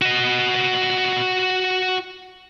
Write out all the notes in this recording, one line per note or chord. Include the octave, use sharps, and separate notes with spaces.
F#4 D#5